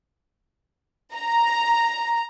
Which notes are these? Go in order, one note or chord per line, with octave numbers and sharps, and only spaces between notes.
A#5